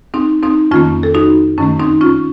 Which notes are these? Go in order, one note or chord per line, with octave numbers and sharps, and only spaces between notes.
C4 D#4
C4 D#4
F2 D#3 A#3 C#4 F4
A4
D#4 F#4
F#2 D#3 A3 C#4
C4 D#4
C#4 F4